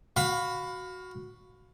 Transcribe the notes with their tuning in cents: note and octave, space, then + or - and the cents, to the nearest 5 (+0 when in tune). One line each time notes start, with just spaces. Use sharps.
F#4 +0 F5 +25 B5 +15